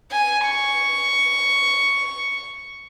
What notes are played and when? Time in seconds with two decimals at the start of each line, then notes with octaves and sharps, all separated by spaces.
0.12 G#5
0.46 C#6